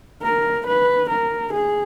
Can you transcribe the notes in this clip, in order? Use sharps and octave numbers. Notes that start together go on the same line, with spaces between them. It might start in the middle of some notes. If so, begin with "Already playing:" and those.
A#4
B4
A#4
G#4